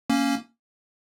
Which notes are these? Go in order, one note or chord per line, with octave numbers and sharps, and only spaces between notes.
A#3 C#4